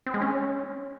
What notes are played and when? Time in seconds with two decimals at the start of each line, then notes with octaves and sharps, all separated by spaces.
0.06 C4
0.14 G#3
0.21 C#4